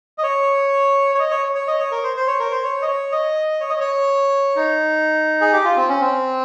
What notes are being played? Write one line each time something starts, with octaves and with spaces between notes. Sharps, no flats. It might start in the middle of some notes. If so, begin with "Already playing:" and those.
D#5
C#5
C#5
D#5
C#5
C#5
D#5
C#5
A#4
C5
C5
C#5
A#4
C5
C#5
D#5
C#5
D#5
C#5
D#5
C#5
D#4
G#4
G4
F4
C4
C#4
C4